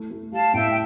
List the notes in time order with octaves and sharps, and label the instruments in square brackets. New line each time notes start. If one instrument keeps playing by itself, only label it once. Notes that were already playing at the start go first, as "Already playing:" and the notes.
Already playing: [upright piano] A3 E4
A3
[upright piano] G3 [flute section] F5 A5
[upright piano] A2 [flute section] E5 G5
[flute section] G5